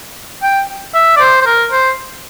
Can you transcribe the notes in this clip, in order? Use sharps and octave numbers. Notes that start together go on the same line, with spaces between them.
G5
E5
D5
C5
C5
A#4
C5